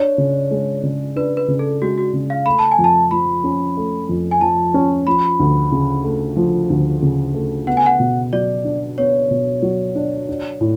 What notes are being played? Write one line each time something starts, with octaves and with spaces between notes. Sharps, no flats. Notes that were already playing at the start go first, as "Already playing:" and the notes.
Already playing: D4 C#5
C#3
G#3
C#3
D4 B4
B4
C#3
A4
G#3 F#4
F#4
C#3
F5
A3 B5
A5
G#5
F2
A5
F3 B5
C#4
A3
F2
G#5
F3 A5
C#4
F3 B5
D2
C#3
A3
F3
D2
C#3
A3
B3 F#5
G#5
F#5
B2
F#3 D5
D4
B3 C#5
B2
F#3
D4
D4
A2